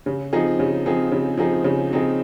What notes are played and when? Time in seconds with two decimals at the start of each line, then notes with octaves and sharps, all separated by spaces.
0.06 C#3
0.33 F3 C4 D#4 G#4
0.59 C#3
0.86 F3 C4 D#4 G#4
1.12 C#3
1.38 F3 C4 D#4 G#4
1.64 C#3
1.91 F3 C4 D#4 G#4